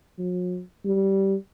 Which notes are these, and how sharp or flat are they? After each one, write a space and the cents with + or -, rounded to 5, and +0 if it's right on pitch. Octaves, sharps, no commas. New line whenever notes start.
F#3 -45
G3 -15